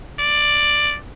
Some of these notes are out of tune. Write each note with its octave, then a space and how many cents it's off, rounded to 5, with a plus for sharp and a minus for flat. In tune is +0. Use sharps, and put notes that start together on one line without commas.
D5 +10